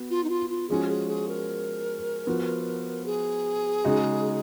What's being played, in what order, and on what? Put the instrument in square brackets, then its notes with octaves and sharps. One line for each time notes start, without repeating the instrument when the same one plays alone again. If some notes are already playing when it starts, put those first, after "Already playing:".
Already playing: [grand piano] B3 F#4
[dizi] F4
D#4
F4
F4
[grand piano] F3 G#3 C#4 F#4 [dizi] G#4
[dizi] G#4
G#4
A#4
[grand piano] F3 B3 F#4
[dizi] G#4
[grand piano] C#3 G#3 D#4 F#4